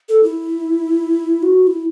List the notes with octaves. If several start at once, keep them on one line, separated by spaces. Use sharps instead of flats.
A4
E4
F#4
F#4
E4